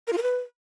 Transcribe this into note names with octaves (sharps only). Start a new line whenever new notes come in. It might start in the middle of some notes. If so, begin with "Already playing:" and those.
A#4
F4
A#4
B4